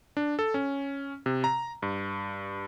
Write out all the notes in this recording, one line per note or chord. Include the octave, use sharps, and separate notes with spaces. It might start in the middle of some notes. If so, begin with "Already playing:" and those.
D4
A4
C#4
C3
A#5
G2